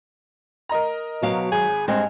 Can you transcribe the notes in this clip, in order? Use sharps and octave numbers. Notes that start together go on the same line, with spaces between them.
A#4 D#5 A#5
B2 F#3 F5
G#1 G#4
G2 G#3 C4